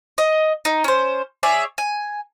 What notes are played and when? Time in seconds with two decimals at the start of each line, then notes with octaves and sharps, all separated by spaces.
0.18 D#5
0.65 D#4
0.84 C#4 C5
1.43 G#4 C#5 D5 E5
1.78 G#5